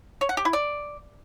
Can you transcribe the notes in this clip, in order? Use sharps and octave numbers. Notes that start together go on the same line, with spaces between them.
C#5
F#5
G4
E4
D5